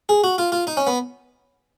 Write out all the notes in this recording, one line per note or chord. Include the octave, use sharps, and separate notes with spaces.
G#4
F#4
F4
F4
D#4
C#4
B3